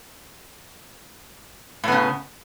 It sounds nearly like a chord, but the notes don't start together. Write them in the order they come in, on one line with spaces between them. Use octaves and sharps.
A2 B3 C#3